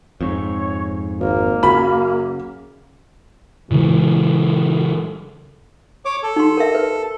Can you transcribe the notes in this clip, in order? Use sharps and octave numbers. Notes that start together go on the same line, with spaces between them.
F2 G#2 C#5
G#1 A#3
F#2 C#3 B5
A#2 C#3 E3 G#3
C#5 D6
A4
D#4 C6
A#4 E5
B4